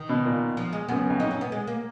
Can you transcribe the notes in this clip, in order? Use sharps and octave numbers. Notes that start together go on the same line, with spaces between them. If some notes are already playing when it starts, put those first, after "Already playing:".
Already playing: D#3
B2
A#2
F3
G#3
F#2 B3
F#2
F2
D#4
C#4
B3
G#3
A#3